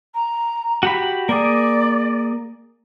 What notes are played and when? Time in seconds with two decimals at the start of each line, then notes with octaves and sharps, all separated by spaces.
0.15 A#5
0.83 F#4 G4 B5
1.29 A#3 G#4 D5